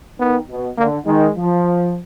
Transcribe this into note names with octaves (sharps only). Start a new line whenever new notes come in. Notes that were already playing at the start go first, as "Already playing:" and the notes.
D#3 B3
B2
D3 A#3
D#3 G#3
F3